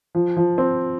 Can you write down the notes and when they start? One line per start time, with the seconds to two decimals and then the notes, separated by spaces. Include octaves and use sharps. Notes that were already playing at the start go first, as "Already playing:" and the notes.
0.15 F3
0.37 F3
0.58 C4